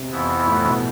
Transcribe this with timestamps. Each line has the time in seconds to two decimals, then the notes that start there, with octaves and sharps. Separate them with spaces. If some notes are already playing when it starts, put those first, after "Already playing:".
Already playing: C3
0.11 F2 E3 B3 E4
0.47 A2
0.65 B2